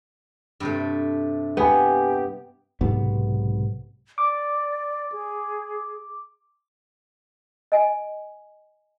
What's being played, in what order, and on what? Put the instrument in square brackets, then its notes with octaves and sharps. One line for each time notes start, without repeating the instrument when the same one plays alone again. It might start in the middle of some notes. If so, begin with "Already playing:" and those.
[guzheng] G2 C3 A3
[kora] B3 [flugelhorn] G4 [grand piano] G#5 B5
[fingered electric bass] B1 G#2 C3 B3
[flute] D5 [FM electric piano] D6
[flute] G#4
[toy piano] D#5 G#5